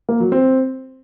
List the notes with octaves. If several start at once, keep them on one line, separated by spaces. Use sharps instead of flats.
A#3
F#3
C4